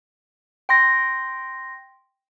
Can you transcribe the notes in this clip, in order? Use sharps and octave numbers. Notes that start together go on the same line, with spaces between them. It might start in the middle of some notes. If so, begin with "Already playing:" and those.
G5 C6 A#6